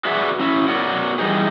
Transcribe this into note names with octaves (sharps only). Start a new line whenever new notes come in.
F#4 G#4 B4 D5 E5 F#5
C#4 E4
B3 F#4 A#4 C#5 D5 F#5
E3 G3 D#4 G#4